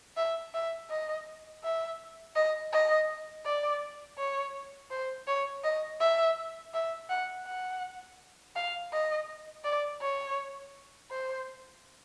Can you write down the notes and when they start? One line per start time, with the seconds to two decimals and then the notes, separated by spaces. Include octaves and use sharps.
0.17 E5
0.54 E5
0.90 D#5
1.64 E5
2.36 D#5
2.73 D#5
3.45 D5
4.18 C#5
4.91 C5
5.28 C#5
5.64 D#5
6.00 E5
6.74 E5
7.09 F#5
7.46 F#5
8.56 F5
8.92 D#5
9.64 D5
10.01 C#5
11.11 C5